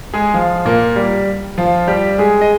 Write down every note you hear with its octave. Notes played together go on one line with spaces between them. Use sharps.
G#3 G#4
F3 F4
A#2 A#3
G3
F3 F4
G3 G4
G#3 G#4
D#5